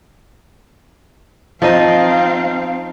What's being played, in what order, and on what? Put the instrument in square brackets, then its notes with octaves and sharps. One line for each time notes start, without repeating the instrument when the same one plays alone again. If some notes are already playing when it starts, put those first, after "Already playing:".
[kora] F3 D#4 D#5 [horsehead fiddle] C4 F5